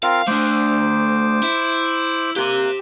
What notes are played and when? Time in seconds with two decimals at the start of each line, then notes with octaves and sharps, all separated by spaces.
0.03 C4 F4 A#4 F5
0.27 A3 D4 C5 D6
1.43 E4
2.36 A#3 G4 C6 F#6